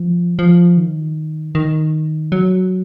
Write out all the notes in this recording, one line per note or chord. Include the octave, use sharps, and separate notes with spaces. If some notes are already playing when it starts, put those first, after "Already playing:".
Already playing: F3
F3
D#3
D#3
F#3